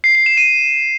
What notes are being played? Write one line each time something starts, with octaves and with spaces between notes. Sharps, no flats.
C7
C7
E7
D#7